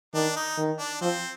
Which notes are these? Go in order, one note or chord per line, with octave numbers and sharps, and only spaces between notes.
D#3 D4
D#4
D#3
D4
F3 C4